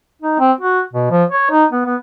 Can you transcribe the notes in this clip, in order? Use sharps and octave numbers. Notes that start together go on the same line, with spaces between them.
D#4
C4
F#4
B2
F3
C#5
D#4
B3
B3